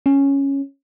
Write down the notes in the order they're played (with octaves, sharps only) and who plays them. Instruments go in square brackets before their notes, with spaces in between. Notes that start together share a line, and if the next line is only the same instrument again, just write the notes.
[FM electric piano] C#4